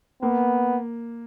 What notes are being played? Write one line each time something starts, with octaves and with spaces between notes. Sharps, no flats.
A#3 B3